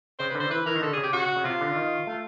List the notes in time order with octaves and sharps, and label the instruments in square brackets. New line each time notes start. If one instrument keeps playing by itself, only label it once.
[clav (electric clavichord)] C#3 [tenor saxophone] C5
[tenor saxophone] B4
[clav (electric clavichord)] D3 [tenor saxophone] C5
[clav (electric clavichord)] E3 [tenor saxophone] B4
[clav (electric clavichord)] E3 [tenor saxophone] A#4
[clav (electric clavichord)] D#3
[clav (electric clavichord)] D3 [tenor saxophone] A4
[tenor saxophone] G#4
[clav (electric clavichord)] C#3
[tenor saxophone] G4
[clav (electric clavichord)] C#3 [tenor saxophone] F#4
[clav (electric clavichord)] C#3
[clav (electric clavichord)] C3 [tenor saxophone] F4
[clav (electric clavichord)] D3
D#3
[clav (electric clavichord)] A3 [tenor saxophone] F4